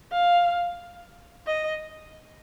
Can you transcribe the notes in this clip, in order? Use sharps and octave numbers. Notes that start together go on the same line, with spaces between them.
F5
D#5